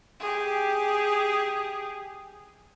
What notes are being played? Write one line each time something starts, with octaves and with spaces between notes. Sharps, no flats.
G4 G#4